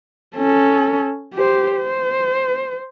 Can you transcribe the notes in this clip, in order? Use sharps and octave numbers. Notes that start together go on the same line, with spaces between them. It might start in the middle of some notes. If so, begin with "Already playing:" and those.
C#4 A4
G4 C5
C5